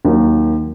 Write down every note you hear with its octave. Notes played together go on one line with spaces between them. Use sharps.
D#2 D#3 F#3 A#3